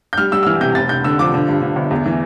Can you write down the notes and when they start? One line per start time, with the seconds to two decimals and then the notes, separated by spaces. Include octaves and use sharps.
0.13 G6
0.18 G3 F6
0.32 G3 E6
0.43 E6
0.46 E3 F6
0.61 C3 G6
0.75 F1 A6
0.89 F1 G6
1.04 D3 E6
1.19 F3 D6
1.34 D3
1.48 G2
1.62 D3
1.76 G1
1.91 E2
2.06 E3